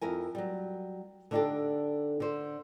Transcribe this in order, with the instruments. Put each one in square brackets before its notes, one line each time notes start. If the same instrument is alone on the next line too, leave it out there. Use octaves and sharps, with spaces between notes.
[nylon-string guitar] F2 E4 A#4 G#5
F#3 G3
D3 D4 D#4 F#4 G4 A4
D3 C5